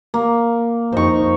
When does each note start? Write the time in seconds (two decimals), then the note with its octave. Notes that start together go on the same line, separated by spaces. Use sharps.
0.14 A#3
0.92 F2 D#4 C5 C#6